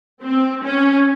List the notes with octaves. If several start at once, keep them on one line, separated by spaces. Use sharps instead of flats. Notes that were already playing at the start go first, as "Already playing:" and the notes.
C4
C#4